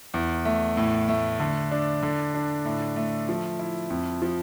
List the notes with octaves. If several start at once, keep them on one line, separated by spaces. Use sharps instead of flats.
E2
A3
A2
A3
D3
D4
D3
D4
A2
A3
F3
E4
F2
F3